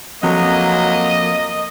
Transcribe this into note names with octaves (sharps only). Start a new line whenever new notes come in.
F2 F#3 A#3 D#5